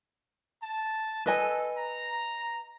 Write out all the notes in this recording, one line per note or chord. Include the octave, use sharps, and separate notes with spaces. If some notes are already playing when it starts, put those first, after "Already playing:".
A5
A4 B4 D#5 G#5
A#5